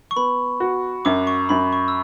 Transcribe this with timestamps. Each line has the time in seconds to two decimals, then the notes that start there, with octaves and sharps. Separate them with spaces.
0.11 C#6
0.16 B3 B5
0.60 F#4
1.05 F#2 D6
1.27 C#6
1.49 F#2 B5
1.72 C#6
1.88 E6